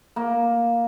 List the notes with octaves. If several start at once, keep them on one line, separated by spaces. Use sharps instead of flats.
A#3